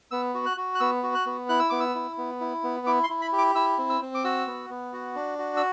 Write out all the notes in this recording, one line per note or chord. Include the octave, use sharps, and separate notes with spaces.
B3 E6
F#4
F#6
F#4
F#6
B3 E6
F#4
F#6
B3
E4 F#6
E6
B3 D6
E6
E4
B3
E4
B3
E4 D6
C6
E4
B5
G4
D6
E4 E6
C4
E6
C4
D6
F#4 E6
B3
B3
F#4
D4
F#4
E6